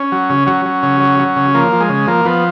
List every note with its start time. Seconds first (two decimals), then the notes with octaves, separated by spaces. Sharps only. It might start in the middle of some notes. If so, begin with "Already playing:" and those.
Already playing: C#4
0.12 F#3
0.30 C#3
0.47 F#3 C#4
0.66 F#3
0.83 C#3
1.01 F#3
1.19 F#3
1.36 C#3
1.54 F3 A#3
1.72 F3
1.80 G#3
1.89 C#3
2.07 F3 A#3
2.25 F3 B3